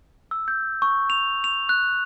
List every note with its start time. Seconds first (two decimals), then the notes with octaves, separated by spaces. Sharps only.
0.31 E6
0.48 G6
0.82 C#6
1.10 F7
1.44 F7
1.69 F#6